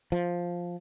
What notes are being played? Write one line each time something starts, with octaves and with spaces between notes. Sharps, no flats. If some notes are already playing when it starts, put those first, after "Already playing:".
F3